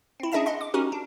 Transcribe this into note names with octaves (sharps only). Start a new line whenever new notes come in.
C4 E4
C#4 D4 G#4 D#5 E5 A5
D#5 F#5 C6
D6
C#4 D#4 F#4 G4 A#4
D4